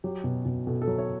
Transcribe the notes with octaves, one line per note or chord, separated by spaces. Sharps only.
F#3 G4
B2
B2
B2 A4
A4
F#3
C#5